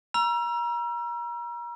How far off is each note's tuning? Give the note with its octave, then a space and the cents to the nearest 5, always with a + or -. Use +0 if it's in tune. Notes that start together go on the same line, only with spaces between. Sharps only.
A#5 +35 E6 +35